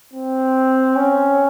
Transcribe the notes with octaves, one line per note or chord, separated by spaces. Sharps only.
C4
C#4